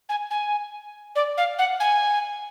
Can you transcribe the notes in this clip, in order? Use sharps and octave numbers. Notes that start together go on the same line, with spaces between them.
G#5
G#5
D5
F5
F#5
G#5